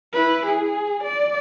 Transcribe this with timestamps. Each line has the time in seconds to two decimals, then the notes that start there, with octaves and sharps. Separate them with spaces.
0.13 E4 B4
0.47 G#4
1.04 D5